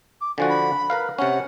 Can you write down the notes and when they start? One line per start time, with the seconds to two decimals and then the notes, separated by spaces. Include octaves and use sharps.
0.21 D6
0.38 D3 F3 F#4 G#5
0.49 B5
0.90 A#4 B4 F5
1.19 C3 C#4 F#5